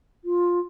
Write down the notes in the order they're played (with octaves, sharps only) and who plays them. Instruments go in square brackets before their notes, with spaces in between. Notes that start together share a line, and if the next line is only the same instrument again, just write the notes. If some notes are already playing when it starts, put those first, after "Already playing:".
[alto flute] F4